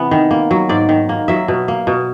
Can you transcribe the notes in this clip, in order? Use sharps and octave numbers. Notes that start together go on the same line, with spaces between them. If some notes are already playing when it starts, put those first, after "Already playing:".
Already playing: C3 E3 B3
D#3
A#3
F#3
G#2 D5
D#3
A#3
F#3 E5
B2
A#3
B2